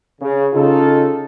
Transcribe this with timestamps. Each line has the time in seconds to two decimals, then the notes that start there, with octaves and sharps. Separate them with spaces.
0.22 C#3
0.54 C#3 D#4 F4 A4